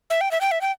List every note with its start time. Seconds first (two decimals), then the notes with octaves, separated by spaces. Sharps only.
0.10 E5
0.21 G5
0.31 E5
0.41 G5
0.51 E5
0.61 G5